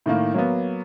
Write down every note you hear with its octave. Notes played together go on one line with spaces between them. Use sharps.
A2 D#3 A#3
F#3 A#3 B3